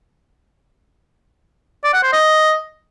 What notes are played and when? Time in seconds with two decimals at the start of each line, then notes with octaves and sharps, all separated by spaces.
1.84 D5
1.94 F#5
2.03 C5
2.13 D#5